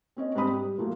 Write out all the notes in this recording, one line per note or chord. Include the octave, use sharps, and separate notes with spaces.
C4 C#4 D#5
G#2 G3 C4 D4 B5 D#6
G3
F3 F#3 A3 A#3